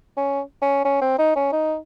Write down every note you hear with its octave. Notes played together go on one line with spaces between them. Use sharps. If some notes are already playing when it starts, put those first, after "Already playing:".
C#4
C#4
C#4
C4
D#4
C#4
D#4